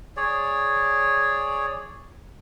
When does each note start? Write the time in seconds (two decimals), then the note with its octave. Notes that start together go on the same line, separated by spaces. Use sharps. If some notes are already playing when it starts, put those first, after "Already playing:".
0.17 G#4 C#5 D5